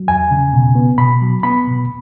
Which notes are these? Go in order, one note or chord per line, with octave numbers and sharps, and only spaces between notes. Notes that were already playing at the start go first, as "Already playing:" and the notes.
Already playing: F#3
E2 G#5
C#3
B2
B3
B2 B5
F#3
B3 B5
B2